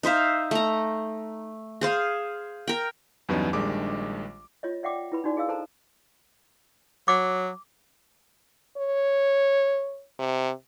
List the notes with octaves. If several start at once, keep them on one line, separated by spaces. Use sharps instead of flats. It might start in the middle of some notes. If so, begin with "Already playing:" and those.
D#4 C5 E5 F5
A3 A#5
G#4 C5 F5
A#4 G5
E2 G2 F#3 B3 C#4 D#4
A#1 D#3 G3 G#3 D4 D6
F4 C#5 D#5
D5 E5 F#5 G5 D6
E4 B4 B5
D4 D#4 F#4 D5
G#4 D#5 F5 E6
A4 C5 A5 A#5
F#3 D6
C#5
C3